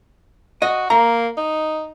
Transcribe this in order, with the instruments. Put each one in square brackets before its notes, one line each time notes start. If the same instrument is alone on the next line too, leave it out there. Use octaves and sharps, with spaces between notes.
[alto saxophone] F#4 [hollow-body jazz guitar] D#5
[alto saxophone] A#3 [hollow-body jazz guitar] A#5
[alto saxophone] D#4